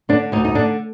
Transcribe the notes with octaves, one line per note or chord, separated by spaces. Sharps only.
D3 D4
D2 D#4
D#4
D3 D4